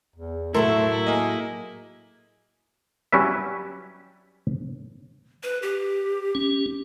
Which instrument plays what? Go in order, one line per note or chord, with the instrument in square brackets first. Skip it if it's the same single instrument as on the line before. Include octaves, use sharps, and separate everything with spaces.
[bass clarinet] E2
[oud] A2 F#3 A#4 [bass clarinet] A3 [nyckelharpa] E4 [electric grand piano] A4 C6
[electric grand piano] A#3 D#5 [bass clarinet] G#4
[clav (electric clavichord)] F#3 G3 C#4 E4 B4 E5
[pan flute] B4
G4
[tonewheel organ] C#4